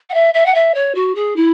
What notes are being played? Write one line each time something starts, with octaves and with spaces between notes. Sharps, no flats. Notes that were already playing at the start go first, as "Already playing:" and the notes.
F#5
E5
E5
F#5
E5
C#5
F#4
G#4
E4